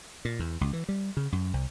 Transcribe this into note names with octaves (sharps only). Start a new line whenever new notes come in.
A#2
E2
C#2
E3
G3
C#3
F#2
C2